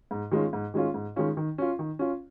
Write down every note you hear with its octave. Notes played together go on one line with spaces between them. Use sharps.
G#2
D#3 G#3 C#4 F4
G#2
D#3 G#3 C#4 F4
G#2
D#3 G#3 C#4 F4
D#3
C#4 F4
D#3
C#4 F4